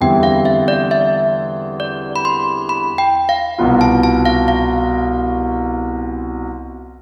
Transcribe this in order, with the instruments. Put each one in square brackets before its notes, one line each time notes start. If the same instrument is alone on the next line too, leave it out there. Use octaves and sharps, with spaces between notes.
[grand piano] E2 D3 G3 C4 E4 [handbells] G5
[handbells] F5
E5
D5
E5
D5
B5
C6
B5
G5
F5
[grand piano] C2 B2 B3 F4
[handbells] A5
A5
F5
F5